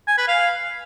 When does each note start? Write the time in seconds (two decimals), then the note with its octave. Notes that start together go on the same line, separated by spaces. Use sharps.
0.08 G#5
0.18 B4
0.28 F5